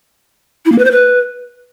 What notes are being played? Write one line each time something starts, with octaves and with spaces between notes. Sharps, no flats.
E4
A#3
B4
C5
B4